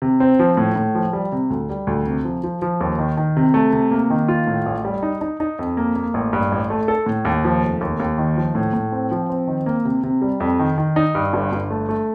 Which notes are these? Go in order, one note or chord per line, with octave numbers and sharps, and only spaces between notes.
C3
C4
F3
A2
A2
F3
G3
C3
D2
G3
D2
C3
F3
F3
F3
D#2
D#3
D#3
C3
A3
C3
A#3
D#3
F4
A2
A1
G3
D#4
D#4
D#4
F2
A#3
A#3
A1
G2
A1
A3
A4
A2
D#2
F3
F1
D#2
D#2
D#3
F3
A2
A2
C4
F3
C4
D#3
A#3
C3
C3
G3
F2
D#3
D#3
D#4
G2
G1
G1
A3
A3